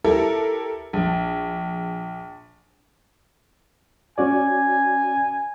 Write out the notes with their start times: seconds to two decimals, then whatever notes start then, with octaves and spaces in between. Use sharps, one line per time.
0.04 E4 G4 A4 A#4
0.93 A#1
4.18 C#4 F#4 D5 G#5